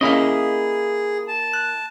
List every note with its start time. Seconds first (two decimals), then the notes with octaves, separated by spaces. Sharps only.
0.01 A#3 C#4 E4 G#4 D#5 F5
1.28 A5
1.53 F#6